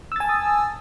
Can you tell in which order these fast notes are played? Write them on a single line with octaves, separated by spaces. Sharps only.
E6 A6 G#5 A5 D#6